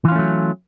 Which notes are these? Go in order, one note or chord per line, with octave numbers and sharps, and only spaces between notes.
E3 F#3 A3 C#4 F4